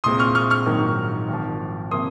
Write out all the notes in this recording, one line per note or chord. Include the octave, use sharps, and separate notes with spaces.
C2 A#2 G#3 C4 C6 D#6
C#6 F6
C#6 F6
C#6 F6
A#1 G#2 D#3 F#3 A#3
G#1 G#2 F3
C3 F3 A#3 C6 D#6